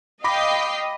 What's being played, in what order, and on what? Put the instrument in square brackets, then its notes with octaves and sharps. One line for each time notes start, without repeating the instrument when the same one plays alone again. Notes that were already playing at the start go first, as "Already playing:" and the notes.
[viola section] D#5 [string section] F5 G5 C7 [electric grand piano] B5 D6 A#6